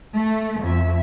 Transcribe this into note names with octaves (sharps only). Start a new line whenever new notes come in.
A3
F2 E5